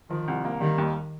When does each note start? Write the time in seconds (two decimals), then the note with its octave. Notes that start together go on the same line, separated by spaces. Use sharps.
0.10 D#3 F3
0.28 C2
0.45 A#3
0.61 D#3 G3
0.78 D#2